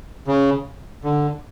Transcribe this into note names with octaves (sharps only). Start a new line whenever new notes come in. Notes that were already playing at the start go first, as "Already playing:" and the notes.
C#3
D3